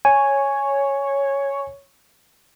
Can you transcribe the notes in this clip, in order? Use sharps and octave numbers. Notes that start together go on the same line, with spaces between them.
C#5 G#5